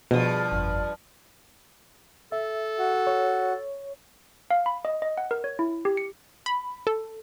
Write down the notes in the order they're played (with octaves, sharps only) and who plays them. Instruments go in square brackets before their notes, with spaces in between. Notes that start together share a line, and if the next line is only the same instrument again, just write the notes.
[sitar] G2 F3 [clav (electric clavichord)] B2 [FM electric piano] G#4
[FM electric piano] G1 F2
[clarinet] A4 [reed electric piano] E5
[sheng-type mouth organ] F#4
[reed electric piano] C#5
[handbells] F5
B5
D#5
D#5
F#5
A#4
C#5
E4
G4
C#7
[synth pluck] B5
A4